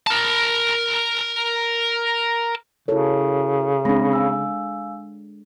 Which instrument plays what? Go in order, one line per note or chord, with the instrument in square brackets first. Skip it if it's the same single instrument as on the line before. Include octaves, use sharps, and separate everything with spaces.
[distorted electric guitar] A#4 A5
[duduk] C#3 [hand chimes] E4 F#4 A#4 [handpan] A4 C#5
[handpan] G#3 D4 [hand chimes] C4 B5 A#6
[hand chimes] F5 G#5 E6